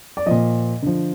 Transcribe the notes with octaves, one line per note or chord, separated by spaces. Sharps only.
D5
A#2 F3 D#5
D3 F3